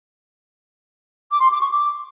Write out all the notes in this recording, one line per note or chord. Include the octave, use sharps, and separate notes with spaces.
D6
C6
D6
C#6
D6